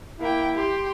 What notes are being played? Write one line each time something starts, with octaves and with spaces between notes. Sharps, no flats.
A#3 E4 G5
G4 C6